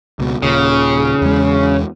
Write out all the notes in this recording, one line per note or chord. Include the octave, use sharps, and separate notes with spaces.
C#2 B2
D#1 A#2 C#3
E2 G#3